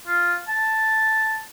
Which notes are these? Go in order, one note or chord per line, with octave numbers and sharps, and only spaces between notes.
F4
A5